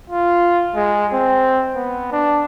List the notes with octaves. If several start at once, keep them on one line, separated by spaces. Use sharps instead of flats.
F4
G#3
C4
B3
D4